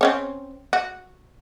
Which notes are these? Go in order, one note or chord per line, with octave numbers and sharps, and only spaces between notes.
C4 C#4 C#5
F#4